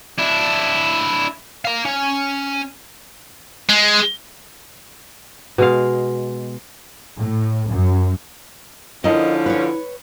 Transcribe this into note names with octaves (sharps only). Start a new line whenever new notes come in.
D4 E4
F5 A#5
C#4
G#3
B2 G#3 F5
A2
F#2
D3 F3 C#4 E4 A#4 D#5
B4 C#5